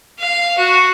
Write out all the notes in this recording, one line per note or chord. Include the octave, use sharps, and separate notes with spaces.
F5
F#4